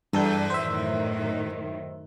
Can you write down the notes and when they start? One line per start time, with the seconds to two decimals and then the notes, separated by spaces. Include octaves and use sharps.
0.13 E2 G2 A4 G6
0.50 F#2 A2 D#3 C5 E5